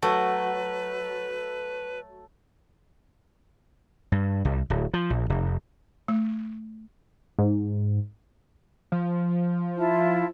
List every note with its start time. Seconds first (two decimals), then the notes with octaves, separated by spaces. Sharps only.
0.02 F#3 A3 B4
4.12 G2
4.45 C2
4.70 D1
4.94 F3
5.10 A#1
5.30 F1
6.08 A3
7.39 G#2
8.92 F3
9.76 E4 F4 A5